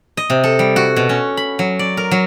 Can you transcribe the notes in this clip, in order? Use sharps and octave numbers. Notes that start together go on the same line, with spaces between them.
D#5
C3
A4
G3
F#4
B2
C#4
B5
F#3
D5
A#4
F#3